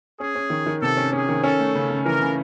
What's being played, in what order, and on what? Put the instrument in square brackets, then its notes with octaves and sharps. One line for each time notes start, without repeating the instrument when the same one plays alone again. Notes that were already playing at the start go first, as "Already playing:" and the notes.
[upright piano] C#4 [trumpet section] G#4
[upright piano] C#4
D#3
D#3
[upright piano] C3 [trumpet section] A4
[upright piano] C#4
[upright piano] C#4 [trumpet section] G#4
[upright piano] D#3
[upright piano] C#4 [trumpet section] A4
[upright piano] A3
C#3
C#3
[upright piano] E3 [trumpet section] A#4
[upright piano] C#3